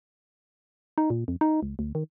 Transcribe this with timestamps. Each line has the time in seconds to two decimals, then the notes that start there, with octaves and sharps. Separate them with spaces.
0.98 D#4
1.10 A#2
1.28 F2
1.41 D#4
1.63 C#2
1.79 D2
1.95 D#3